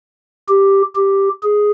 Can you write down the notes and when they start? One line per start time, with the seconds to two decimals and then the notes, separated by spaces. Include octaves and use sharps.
0.48 G4
0.95 G4
1.43 G#4